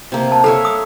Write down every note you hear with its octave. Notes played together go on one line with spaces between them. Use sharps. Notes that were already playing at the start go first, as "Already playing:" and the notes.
C3 A#3
A5
A4 C#5 E5 F5
D#6